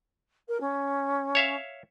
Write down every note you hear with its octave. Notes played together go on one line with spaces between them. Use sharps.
A#4
C#4
C#5 E5 F5